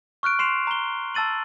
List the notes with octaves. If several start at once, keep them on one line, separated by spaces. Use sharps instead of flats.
C#6 F6 F#6 D7
C6 C7 E7 F7
A#5 G7
A5 E6 A6 D#7 F#7